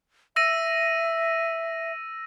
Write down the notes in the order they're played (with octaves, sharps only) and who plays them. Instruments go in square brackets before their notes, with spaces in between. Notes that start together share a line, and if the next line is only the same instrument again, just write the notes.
[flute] E5 [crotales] E6 A#6 D#7